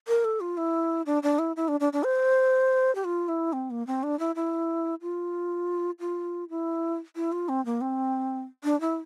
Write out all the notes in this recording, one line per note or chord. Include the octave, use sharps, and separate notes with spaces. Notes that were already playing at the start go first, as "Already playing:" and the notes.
A#4
A4
F4
E4
D4
D4
E4
E4
D4
D4
D4
C5
G4
F4
E4
C4
A#3
C4
D4
E4
E4
F4
F4
E4
E4
F4
C4
A#3
C4
D4
E4